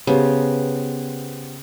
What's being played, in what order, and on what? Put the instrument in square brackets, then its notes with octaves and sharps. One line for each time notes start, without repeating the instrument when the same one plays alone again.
[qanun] C#3 [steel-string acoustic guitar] B3 G4 C5